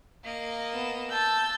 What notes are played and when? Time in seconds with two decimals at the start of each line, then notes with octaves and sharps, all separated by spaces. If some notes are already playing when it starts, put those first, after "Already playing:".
0.24 A#3 D#5
0.73 B3 E7
1.10 A5 E6 G6